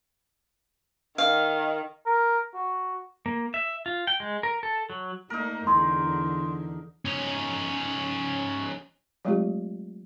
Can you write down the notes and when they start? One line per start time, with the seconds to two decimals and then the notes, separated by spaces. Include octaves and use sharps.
1.18 D#3 F5
2.06 A#4
2.54 F#4
3.26 A#3
3.54 E5
3.86 F4
4.07 G5
4.20 G#3
4.43 A#4
4.63 A4
4.90 F#3
5.30 A3 A#3 D#4 A#4
5.67 E2 D3 G#4 C6
7.05 C#4 D#4
9.25 F#3 G#3 A3 C4 F4 G4